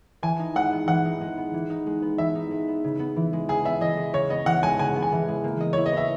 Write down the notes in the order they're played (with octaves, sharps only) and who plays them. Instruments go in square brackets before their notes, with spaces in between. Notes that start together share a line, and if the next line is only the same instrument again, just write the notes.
[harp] E3 [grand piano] G#5
[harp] D#4
[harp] G#3 [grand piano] F#5
[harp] B3
[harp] E3 [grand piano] F#5
[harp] D#4
G#3
B3
E3
D#4
G#3
B3
[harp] E3 [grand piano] E5
[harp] D#4
G#3
B3
C#3
B3
E3
G#3
[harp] C#3 [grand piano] G#4
[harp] B3 [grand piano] E5
[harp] E3 [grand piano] D#5
[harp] G#3
[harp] C#3 [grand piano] C#5
[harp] B3 [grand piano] D#5
[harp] E3 [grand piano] F#5
[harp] G#3 [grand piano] G#5
[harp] C#3 [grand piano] G#5
[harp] B3
[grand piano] G#5
[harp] E3
G#3
A#3
D#5
[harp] E4 [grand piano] C#5
[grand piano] D#5
[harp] B4 [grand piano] E5